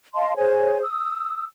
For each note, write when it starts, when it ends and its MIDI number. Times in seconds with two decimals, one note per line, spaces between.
0.14 0.33 75
0.14 0.33 77
0.14 0.33 81
0.14 0.33 84
0.36 0.81 68
0.36 0.81 72
0.36 0.81 73
0.36 0.81 80
0.82 1.45 87
0.82 1.45 88